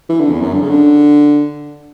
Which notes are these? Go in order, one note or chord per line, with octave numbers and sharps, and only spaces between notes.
E3
D3
E2
F#2
D3
C#3
D3